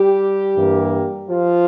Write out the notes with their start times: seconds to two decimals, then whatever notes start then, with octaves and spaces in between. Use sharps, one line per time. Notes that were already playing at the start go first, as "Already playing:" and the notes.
Already playing: G3 G4
0.56 G2 E3 A#3
1.29 F3 F4